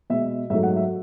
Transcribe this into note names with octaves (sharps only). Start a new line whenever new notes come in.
B2 G#3 E5
G#2 F#3 A3 E5
F#5
E5